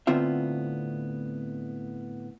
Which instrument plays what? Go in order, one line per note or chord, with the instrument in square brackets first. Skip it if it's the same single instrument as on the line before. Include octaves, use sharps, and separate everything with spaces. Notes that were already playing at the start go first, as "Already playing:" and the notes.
[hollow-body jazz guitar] A2 D3 B3 C4 F4 E5